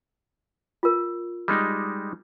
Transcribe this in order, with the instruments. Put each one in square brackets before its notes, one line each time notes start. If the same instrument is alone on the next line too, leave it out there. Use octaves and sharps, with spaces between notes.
[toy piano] F4 A#4
[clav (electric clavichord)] G3 G#3 D#4